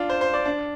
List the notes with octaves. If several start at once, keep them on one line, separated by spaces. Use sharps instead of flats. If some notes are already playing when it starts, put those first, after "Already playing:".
Already playing: D4 F4
C5
C5
D5
D4